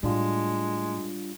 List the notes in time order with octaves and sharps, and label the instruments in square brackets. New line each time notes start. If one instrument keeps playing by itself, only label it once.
[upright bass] A2 [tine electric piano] G3 D4 F4 [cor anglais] G#3